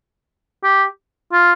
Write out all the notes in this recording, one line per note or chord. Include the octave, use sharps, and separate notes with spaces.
G4
F4